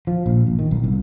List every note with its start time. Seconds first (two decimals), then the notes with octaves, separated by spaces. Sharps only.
0.07 F3
0.26 A#1
0.47 A#1
0.59 D#3
0.71 B1
0.84 C2